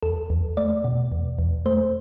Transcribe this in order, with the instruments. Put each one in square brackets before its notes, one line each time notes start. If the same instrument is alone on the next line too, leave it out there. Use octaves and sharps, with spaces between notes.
[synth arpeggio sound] E2 A4
E2
A3 D5
B2
E2
E2
A3 C5